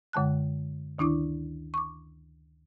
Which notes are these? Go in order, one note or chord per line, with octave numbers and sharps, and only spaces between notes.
F#2 D3 G#3 A5 F#6
D2 D#3 D4 E4 D6
C#6 D6